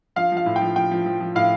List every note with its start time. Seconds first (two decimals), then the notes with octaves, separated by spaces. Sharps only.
0.16 F3 F5
0.32 F3
0.37 F5
0.46 A2
0.56 G5
0.61 F3
0.76 F3 G5
0.91 F3
1.06 F3
1.20 F3
1.35 A2 F5